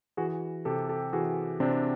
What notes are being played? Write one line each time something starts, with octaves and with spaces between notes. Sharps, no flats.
E3 F#4 G#4
C3 G4 A4
G4 A4
E3 F#4 G#4
C3 C4 D4